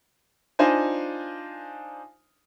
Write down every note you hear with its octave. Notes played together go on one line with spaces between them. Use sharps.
D4 D#4 F4 C5 G#5